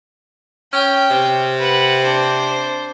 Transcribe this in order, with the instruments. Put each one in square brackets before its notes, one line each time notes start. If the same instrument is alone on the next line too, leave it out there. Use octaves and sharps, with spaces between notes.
[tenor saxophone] C#4 [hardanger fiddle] G5
[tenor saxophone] C3
[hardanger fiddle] B4 F#5
D4 C5